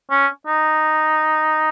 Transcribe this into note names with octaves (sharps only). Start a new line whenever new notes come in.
C#4
D#4